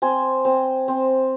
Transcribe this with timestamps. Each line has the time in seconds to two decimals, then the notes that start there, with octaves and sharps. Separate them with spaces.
0.02 C4 G#5 C6
0.45 C4
0.88 C4